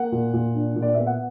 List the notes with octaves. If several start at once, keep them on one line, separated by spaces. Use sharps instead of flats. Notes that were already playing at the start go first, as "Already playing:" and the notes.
Already playing: A#3 F#5
A#2
A#2
D4
A#2
D5
B3 E5
F#5